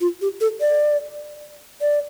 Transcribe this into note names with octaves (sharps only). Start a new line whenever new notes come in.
F4
G4
A4
D5
D5